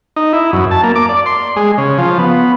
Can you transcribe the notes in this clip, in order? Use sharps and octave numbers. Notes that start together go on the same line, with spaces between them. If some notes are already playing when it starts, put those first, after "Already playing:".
D#4
E4
F#2
A5
A#3
D6
D5
C6
G#3
C#3
F3
B3